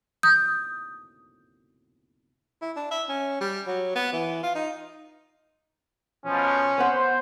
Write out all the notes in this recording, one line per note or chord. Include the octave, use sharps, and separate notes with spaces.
D#6 G6
E4
D4
E5
C#4
G3
F#3
B3
E3
F4
D#4
B2 F3 C#4
B3 B4 C5 F#5